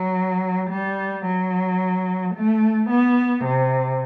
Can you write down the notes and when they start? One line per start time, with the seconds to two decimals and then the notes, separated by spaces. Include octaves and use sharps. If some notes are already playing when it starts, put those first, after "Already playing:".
Already playing: F#3
0.71 G3
1.26 F#3
2.35 A3
2.90 B3
3.45 C3